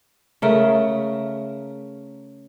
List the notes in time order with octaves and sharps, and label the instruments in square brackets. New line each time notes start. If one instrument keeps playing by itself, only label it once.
[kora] C#3 A3 A#4